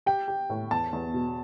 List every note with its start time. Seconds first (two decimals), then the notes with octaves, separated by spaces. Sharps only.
0.06 G4 G5
0.28 G4
0.50 A2
0.71 E2 A5
0.93 E2
1.14 B2